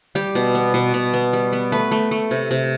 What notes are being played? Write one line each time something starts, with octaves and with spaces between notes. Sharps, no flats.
G3 G4
B2
B3
B2
B2
B3
G3
B3
A3 B4
A3
A3
C3
C3